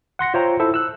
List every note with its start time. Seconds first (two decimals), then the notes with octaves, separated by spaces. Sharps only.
0.19 F#5 C6 A#6 C#7
0.34 F4 C5 C#5 E5 G5 A#5
0.59 E4 A4 C5 E5
0.74 E6 F#6